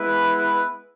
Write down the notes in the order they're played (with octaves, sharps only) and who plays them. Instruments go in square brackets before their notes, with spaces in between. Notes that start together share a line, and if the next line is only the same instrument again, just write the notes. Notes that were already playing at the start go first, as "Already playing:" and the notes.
Already playing: [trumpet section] G#3 B3 E4 B4